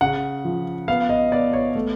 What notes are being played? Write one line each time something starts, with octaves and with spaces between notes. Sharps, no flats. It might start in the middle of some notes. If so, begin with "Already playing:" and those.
C#3 F#5
F3
B3 F5
D#5
B3 D5
C#5
A3